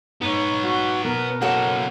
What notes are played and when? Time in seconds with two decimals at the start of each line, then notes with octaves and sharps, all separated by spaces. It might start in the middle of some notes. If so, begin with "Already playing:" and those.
0.21 G#2 B3 C#5
0.63 F#4
1.04 B2 A#4
1.42 F#3 A#3 F#4 A4